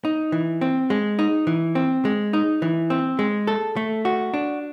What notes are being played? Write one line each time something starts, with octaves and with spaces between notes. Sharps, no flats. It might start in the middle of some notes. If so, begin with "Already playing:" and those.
D#4
E3
C4
G#3
D#4
E3
C4
G#3
D#4
E3
C4
G#3
A4
A3
F#4
D4